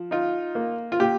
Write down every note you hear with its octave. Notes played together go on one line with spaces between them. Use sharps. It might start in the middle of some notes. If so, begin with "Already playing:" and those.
Already playing: F3
D#4 F4
A#3
F4
A#2 G4